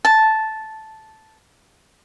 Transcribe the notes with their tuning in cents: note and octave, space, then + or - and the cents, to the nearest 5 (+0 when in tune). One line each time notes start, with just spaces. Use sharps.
A5 -5